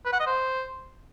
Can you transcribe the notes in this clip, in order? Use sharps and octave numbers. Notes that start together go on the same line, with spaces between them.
B4
F#5
D#5
C5